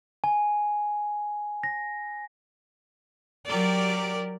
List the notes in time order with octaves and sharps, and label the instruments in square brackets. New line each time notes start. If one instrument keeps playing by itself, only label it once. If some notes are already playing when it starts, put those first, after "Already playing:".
[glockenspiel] G#5
A#6
[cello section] F#3 G4 A#4 D5